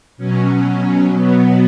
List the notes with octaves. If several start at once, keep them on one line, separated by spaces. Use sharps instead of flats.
B2 F#3 C#4
B3